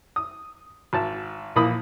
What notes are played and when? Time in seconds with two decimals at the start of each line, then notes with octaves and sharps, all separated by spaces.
0.16 D#6
0.93 G#1 A5
1.56 A#1 E3 A#3 B5 D#6